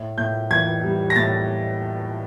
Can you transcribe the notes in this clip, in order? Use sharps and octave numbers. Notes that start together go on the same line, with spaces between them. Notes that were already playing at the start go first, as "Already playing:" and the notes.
Already playing: A2
A2 G6
E3 G#6
G3
A#6
A2 A6